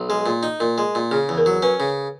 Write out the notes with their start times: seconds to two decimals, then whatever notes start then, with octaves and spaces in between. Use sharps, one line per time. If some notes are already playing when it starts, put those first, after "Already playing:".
Already playing: B1
0.09 G#3 G#4
0.26 A#2
0.43 D#4
0.60 A#2 A#4
0.78 G#3
0.95 A#2
1.11 C#3 G#4
1.29 E2
1.38 A#4
1.46 F#3
1.62 C#4 B4
1.80 C#3